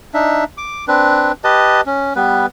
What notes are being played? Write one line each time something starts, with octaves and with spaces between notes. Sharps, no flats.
D4 D#4 E5
D6
C4 D4 B4
G4 B4 D#5 A5
C#4
G3 B3 B4